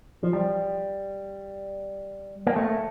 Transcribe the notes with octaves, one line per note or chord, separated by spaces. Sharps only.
F3
G3
A#3
A3